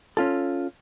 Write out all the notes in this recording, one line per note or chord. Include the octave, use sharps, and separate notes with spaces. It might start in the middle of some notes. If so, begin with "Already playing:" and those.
C#4 F4 A4